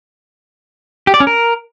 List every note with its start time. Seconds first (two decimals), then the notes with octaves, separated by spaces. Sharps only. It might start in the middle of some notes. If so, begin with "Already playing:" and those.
1.07 G4
1.14 D5
1.20 C#4
1.27 A#4